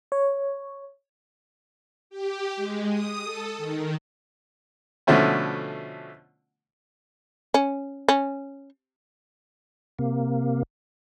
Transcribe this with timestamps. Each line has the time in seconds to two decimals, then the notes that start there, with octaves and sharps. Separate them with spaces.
0.12 C#5
2.10 G4
2.56 G#3
2.89 D#6
3.24 A4
3.57 D#3
5.07 B2 D3 F3 A3 C#4 E4
7.54 C#4
8.08 C#4
9.99 C3 A#3